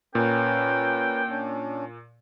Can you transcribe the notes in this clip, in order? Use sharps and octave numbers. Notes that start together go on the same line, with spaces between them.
A#2 C#4 A#4 B4 G5
C#4 D4